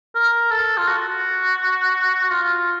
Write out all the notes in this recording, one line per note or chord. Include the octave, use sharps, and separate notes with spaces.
A#4
A4
F4
F#4
F4